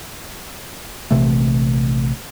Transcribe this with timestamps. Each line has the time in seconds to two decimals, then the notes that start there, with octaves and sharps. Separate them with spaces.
1.11 A#1 C3 E3 A3